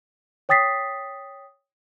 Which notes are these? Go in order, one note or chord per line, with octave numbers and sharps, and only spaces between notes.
C#5 G5 D#6 A6 B6 C7